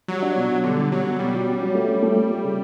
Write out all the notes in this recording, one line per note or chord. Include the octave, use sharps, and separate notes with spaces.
F#3 G3
D4
B2
B2
D3 G3
G3
B2 F#3
B2
B2 G3
F#3
C#4
F#3
A3
C#4
A3
A3
A3
C#3